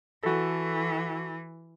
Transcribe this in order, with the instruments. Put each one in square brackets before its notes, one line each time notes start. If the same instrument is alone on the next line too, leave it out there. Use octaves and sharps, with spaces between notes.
[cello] E3 [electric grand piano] F#4 A4